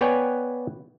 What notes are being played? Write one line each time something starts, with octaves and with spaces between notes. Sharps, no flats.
B3 B4 C#5 D5 G5 G#5